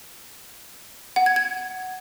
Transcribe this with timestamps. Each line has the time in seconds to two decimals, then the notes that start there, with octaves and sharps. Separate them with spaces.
1.16 F#5
1.26 G#6
1.36 G#6